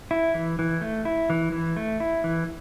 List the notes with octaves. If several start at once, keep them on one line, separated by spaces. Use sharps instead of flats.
E4
E3
E3
A3
E4
E3
E3
A3
E4
E3